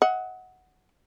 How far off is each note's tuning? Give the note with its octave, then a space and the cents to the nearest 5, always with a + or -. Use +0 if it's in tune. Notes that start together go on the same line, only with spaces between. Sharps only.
D#5 +35 F#5 +0